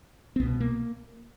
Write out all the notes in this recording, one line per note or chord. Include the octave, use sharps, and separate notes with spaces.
C4
C2 B2 B3
A#3